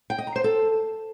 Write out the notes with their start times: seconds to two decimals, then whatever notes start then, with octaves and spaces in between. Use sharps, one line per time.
0.10 G5
0.18 D#5
0.27 A#5
0.36 C5
0.44 A4